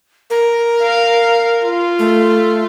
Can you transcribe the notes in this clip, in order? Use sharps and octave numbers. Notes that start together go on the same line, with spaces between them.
A#4
F5
F4
A3